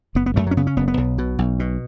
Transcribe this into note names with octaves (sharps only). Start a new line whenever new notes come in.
F#1 B3
B3
F#2 A3
F#3
C#4
C#3 B3
C#4
F#1 B3
B3
B1
B2
B1
B2